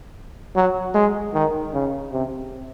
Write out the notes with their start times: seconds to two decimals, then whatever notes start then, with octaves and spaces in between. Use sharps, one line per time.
0.56 F#3
0.94 G#3
1.34 D#3
1.73 C#3
2.12 C3